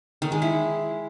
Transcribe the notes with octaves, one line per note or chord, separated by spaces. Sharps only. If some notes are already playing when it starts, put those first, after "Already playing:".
D#3
G#3
E4